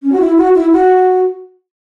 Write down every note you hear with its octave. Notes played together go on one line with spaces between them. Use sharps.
C#4
F#4
E4
F#4
E4
F#4